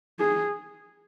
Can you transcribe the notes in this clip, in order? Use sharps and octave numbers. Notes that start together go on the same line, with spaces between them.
G#4